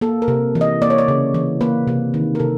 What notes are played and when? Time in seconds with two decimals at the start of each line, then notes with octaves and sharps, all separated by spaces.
0.01 A#3 A4
0.22 A#4
0.28 C3
0.55 E3
0.61 D#5
0.82 A#3 D5
0.90 C#5
0.98 D5
1.08 C#3
1.34 E3
1.61 A#3 B4
1.88 C3
2.14 D#3
2.35 A#4
2.39 C3 A4